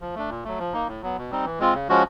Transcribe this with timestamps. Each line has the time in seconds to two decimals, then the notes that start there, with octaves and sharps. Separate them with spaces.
0.01 F3
0.15 A3 D4
0.29 A#2
0.45 F#3 A3
0.59 F3
0.73 A#3 D#4
0.87 A2
1.03 F#3 B3
1.17 B2
1.31 G3 C4 D#4
1.45 E3
1.59 G#3 C4 F4
1.74 C#3
1.89 F3 G#3 C#4 F#4